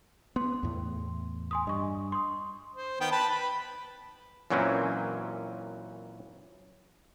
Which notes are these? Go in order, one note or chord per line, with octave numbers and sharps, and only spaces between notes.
B3 C6
E2 A2
G#5 C6 D#6
G2 D#5 C#6
C6 D#6
C5
D#3 B3 G5
B4 A5 B5
B4
F#2 A#2 E3 F#3 C4 C#4